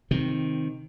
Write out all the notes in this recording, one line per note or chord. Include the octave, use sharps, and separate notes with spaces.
C3 D#3